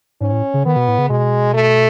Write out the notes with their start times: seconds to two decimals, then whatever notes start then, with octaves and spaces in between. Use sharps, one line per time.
0.21 G#2 C#4
0.32 A2
0.54 C#3
0.65 D#3 B3
0.76 B2
0.88 A2
0.98 C#3
1.10 B2 G#3
1.54 A3